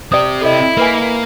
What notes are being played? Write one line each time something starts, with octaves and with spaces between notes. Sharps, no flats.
C4 G4 D5 D#6
E4 A4 D#5
A#3 A#4 B4 G#5